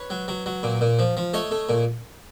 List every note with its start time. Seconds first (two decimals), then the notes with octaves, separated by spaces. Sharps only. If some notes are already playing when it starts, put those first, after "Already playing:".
Already playing: B4 C#5
0.10 F#3
0.28 F#3
0.46 F#3
0.63 A#2
0.81 A#2
0.99 F3
1.17 F3
1.34 A3 C#5 D#5
1.51 A3
1.69 A#2